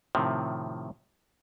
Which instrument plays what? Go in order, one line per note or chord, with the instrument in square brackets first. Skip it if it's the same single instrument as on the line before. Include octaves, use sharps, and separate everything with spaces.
[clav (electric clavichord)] A2 C3 D#3 F3